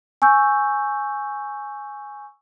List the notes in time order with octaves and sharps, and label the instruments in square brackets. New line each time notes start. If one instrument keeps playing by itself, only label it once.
[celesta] G#5 C#6 E6 G6